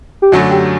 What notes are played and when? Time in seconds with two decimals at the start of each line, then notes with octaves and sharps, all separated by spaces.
0.22 G4
0.32 F#2 D3 F#3 A3 F#4
0.51 G4